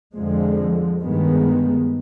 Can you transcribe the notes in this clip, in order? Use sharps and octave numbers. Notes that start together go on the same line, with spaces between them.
F2 D3 F3 G#3
G2 D#3 G#3 B3